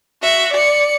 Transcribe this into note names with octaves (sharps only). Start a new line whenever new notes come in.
F#4 E5
D5 C#7